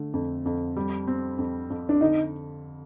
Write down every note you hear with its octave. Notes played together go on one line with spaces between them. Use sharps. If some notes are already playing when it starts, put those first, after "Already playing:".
Already playing: D3 A3
F2
F2
G3
C4
F2
F2
D4
D3 D#4